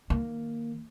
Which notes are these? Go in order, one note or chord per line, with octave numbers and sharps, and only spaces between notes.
D#3 A#3